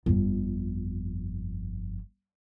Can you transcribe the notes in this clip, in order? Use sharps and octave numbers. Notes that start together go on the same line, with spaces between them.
G1 F2